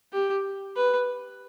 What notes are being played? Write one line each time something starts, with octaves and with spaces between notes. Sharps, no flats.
G4
B4